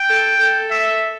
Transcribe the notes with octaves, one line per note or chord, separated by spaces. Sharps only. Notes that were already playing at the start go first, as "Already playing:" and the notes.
Already playing: G5
A4
A4
E5